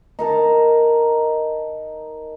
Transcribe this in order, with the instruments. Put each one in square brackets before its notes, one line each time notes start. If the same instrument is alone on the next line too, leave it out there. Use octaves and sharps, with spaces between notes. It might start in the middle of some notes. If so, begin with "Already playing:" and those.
[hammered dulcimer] D#4 A#4 A5